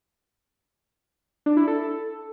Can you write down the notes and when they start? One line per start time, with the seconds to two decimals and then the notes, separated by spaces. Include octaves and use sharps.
1.46 D4
1.57 E4
1.67 A4